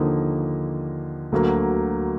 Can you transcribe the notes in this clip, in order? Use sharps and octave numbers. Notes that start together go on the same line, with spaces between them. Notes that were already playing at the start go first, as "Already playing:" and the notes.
Already playing: D#2 D3 F3 A#3 D#4
D2 D3 F#3 A#3